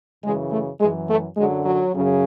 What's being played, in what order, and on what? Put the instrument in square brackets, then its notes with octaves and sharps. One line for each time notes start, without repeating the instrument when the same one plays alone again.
[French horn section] F#2 C#3 E3 G#3
A3
F#2 E3 G#3
A3
F#2 D3 F#3 G#3
F#3
F#2 C#3 F#3